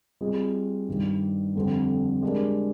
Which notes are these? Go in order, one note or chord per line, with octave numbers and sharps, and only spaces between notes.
G3 C4 F4 G#4 D#5
G2 D#3 G3
F2 D3 G3 C4
G#3 D4 G4 A#4 D5